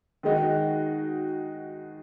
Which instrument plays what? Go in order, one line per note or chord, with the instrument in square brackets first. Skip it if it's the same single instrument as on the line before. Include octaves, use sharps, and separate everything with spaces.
[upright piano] D#3 G#3 D#4 F#4